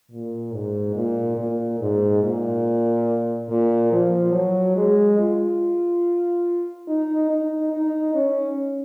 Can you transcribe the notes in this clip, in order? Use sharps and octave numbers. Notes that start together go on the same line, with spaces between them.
A#2
G#2
A#2
A#2
G#2
A#2
A#2
F3
F#3
G#3
F4
D#4
D#4
D#4
C#4